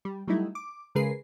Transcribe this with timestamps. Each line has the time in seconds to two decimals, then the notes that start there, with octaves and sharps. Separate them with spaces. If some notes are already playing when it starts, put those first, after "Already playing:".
0.05 G3
0.28 F#3 G3 A3 D#4 E4
0.55 D6
0.95 C#3 G#3 G#4 A#4 B4 C7